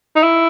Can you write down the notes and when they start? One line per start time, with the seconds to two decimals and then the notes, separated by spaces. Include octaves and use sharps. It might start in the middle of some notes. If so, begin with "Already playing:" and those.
0.16 D#4
0.23 E4